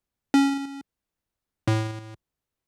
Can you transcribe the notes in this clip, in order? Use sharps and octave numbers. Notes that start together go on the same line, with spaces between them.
C#4
A2